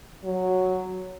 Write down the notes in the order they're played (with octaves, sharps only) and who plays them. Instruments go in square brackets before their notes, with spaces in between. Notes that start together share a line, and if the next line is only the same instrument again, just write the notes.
[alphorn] F#3